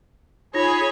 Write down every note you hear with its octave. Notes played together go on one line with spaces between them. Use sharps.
D#4 F4 G#4 C#5 B5 A#6